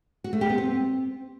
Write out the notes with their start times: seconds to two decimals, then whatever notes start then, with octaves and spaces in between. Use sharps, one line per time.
0.24 F#4
0.33 A3
0.41 G4
0.50 B3
0.58 C4